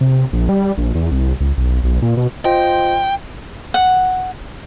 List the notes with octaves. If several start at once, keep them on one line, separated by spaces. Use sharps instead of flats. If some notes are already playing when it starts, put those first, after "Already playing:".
C3
A#1
G3
A#1
E2
C2
C#2
B1
B1
A#2
B2
F4 C5 D#5 G5
F#5